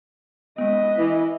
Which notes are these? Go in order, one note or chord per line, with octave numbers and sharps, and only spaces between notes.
G#3 B3 B4 D#5
E3